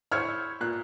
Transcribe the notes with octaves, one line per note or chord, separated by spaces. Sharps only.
E4 C5 C#5 F6 G#6 C#7
A#2 F#6